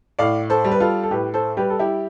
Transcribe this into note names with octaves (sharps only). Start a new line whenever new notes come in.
A2 D5 F5
A4 C5
G3
B4
F4 A4
A4
A2 G4 B4
A4 C5
G3 G4 B4
A4
E4 G4